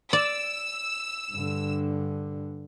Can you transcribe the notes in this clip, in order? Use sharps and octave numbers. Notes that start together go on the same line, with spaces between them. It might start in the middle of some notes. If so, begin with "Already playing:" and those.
D5 E6
G2 D3